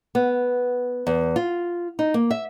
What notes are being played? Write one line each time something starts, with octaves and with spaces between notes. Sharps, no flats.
B3
E2
F4
D#4
A#3
E5